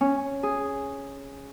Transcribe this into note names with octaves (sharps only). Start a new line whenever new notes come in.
C#4
G#4